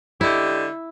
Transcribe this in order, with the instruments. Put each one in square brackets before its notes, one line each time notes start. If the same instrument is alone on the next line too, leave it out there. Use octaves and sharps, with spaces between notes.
[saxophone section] D3 G#3 G4 [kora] E4